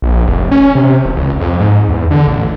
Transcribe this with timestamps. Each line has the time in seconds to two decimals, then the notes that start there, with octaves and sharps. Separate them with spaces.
0.02 A#1
0.27 F1
0.51 C#4
0.75 C3
1.05 E1
1.16 C#2
1.40 F2
1.60 G#2
1.89 E2
2.11 D3
2.27 A1